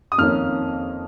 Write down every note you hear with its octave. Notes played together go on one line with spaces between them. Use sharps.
D#6
F2 D#3 A#3 C#4 F6